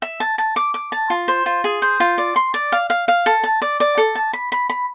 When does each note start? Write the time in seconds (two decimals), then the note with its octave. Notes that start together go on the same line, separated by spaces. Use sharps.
0.02 E5
0.20 A5
0.38 A5
0.56 D6
0.74 D6
0.92 A5
1.10 F4
1.28 C5
1.46 F4
1.64 G#4
1.82 C5
2.00 F4
2.18 D5
2.36 C6
2.54 D5
2.72 F5
2.90 F5
3.08 F5
3.26 A4
3.44 A5
3.62 D5
3.80 D5
3.97 A4
4.15 A5
4.33 B5
4.52 B5
4.70 B5